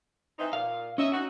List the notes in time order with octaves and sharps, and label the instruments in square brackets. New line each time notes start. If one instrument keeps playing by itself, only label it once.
[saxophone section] E3 C4 D#4
[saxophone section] A#2 [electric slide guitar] F5
[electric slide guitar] C#4 [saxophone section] D#5 E5
[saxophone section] D#4 F#4